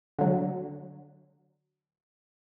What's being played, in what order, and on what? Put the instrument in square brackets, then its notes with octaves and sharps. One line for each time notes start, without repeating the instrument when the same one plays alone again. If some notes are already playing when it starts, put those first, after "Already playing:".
[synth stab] D3 F#3